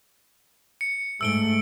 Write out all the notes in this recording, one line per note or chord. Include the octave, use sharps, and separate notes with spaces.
C#7
G#2 A3 E6 D7 G7